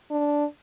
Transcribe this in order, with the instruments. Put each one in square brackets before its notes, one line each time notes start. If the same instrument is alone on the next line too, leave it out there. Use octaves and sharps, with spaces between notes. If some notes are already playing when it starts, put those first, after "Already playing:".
[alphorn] D4